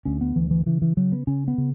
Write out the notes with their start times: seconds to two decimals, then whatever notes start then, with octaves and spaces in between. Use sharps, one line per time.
0.05 D2 C#4
0.21 B3
0.36 D2 E3
0.51 E3
0.66 C#3 E3
0.82 E3
0.97 C#3 F#3
1.12 B3
1.27 C#3 C#4
1.48 B3
1.58 C#3